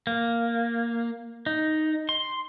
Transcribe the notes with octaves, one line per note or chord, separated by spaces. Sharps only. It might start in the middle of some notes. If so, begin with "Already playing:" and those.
A#3
D#4
C6